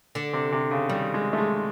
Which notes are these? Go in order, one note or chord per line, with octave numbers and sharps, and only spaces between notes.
D3
C3
C3
C#3
D#3 G3
G#3
A3
G#3